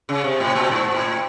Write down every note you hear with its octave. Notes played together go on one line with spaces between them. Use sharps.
C#3
C3
A2
A#2
G#2
A2